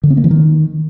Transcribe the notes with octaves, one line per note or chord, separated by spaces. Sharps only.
D3
C4
A#3
E3
D#3